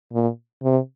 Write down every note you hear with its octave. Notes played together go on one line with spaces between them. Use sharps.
A#2
C3